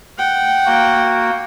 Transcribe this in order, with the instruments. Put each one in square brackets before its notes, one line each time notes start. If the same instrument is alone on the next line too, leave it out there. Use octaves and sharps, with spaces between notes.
[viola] F#5 G5
[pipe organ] A#3 F#4